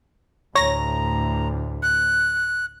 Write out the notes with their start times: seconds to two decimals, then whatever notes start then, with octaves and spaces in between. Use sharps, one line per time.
0.55 D2 A2 C#5 A#5 A#6
1.83 F#6